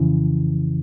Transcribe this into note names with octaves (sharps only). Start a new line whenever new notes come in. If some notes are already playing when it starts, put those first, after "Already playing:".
Already playing: F2 C#3 E3